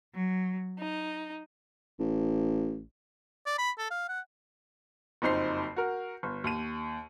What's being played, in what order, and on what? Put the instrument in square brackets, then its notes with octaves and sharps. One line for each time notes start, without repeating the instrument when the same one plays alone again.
[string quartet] F#3
D#4
[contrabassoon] A1
[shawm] D5
B5
A4
F5
F#5
[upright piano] F#1 F2 D#4 C5 C7
F#4 A#4
G1
D#2 D#7